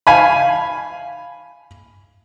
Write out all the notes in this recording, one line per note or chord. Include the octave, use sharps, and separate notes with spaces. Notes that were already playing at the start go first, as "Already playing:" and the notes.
F5 G#5 B5